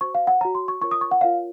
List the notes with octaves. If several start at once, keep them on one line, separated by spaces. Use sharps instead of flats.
F#4 C5 C#6
F5
F#5
F#4 C#5 A#5
C6
C#6
F4 A#4 C#5 C#6
D#6
C#6
F#5
F4 A#4 C#5 F5